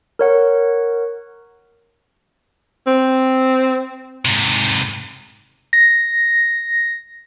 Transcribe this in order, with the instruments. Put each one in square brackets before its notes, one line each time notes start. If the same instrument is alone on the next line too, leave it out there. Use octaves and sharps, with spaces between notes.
[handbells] A#4 C#5 F#5
[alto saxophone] C4
[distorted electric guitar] G#2 C3
[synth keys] A#6